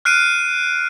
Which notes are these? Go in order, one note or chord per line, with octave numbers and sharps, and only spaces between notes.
F6 F#6 C7 D7 D#7